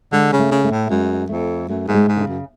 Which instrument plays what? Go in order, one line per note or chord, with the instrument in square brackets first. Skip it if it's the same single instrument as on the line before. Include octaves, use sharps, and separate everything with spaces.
[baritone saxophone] D3 [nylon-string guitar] G#3
[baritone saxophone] C#3
[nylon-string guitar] A3
[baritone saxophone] C#3
[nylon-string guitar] A3
[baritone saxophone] A2
[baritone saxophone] F#2 [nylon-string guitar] G#3
[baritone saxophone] F2 [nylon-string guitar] A3
[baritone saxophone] F#2 [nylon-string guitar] A3
[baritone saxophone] G#2 [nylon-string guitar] A3
[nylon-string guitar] G#3
[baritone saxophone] G#2
[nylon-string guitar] D3
C#3
[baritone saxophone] F#2